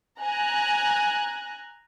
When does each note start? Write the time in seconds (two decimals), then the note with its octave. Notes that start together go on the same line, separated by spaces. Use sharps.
0.21 G#5 A#5 F#6